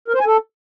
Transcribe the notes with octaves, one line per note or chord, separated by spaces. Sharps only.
A#4
C5
G#5
A4